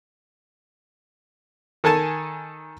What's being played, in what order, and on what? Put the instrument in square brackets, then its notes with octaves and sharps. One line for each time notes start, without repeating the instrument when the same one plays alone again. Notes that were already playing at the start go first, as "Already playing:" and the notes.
[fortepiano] D#3 A4 G#5 A5